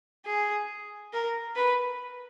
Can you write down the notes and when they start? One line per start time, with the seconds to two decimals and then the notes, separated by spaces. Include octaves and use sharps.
0.26 G#4
1.13 A#4
1.56 B4